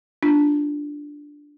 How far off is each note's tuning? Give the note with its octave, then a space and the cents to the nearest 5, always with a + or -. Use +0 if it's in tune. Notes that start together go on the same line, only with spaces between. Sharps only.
D4 +0 F4 -5